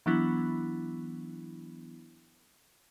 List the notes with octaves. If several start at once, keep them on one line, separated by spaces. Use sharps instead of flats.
E3 F#3 B3 D4 E4